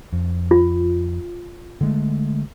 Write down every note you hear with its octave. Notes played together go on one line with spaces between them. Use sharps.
F2
F4
D3 G#3 A3